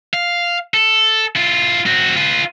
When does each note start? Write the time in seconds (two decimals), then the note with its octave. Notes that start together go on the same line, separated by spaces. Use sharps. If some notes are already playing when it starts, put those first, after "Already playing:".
0.14 F5
0.74 A4
1.36 E4 F4
1.86 C4 F#4
2.17 F4 B4